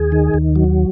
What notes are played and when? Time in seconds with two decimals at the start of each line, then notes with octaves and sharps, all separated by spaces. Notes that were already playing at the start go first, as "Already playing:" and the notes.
Already playing: D#2 G#4
0.12 D#3
0.34 D#2
0.56 F#3